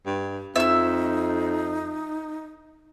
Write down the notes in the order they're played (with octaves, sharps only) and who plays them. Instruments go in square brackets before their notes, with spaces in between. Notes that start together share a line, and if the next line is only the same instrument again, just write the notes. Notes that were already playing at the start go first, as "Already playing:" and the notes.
[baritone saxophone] G2
[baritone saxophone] F2 [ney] D#4 [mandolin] E5 E6